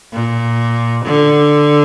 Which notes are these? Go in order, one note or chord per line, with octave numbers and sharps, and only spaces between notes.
A#2
D3